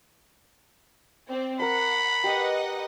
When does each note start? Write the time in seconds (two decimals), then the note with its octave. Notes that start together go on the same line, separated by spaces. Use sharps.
1.28 C4 D5
1.60 A#4 D5 F#5 A5 B5
2.24 G4 B4 D5 D#5 F#5